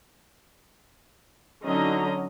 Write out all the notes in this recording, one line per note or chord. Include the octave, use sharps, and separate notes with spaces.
D3 F#3 C#4 D#4 D#5 A#5